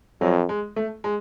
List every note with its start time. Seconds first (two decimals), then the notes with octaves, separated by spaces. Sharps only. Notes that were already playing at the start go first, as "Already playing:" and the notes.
0.20 F2 F#3
0.49 G#3
0.76 A3
1.04 G#3